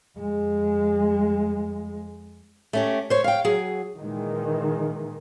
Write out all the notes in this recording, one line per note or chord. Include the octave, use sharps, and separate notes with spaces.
F2 G#3
A3 C#4 G4
C5 C#5
F5 G5
F#3 G#4
A#2 D#3 E3 G#3